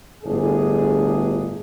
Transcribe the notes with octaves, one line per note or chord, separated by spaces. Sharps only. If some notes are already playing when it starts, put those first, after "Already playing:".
G1 A2 D4 G#4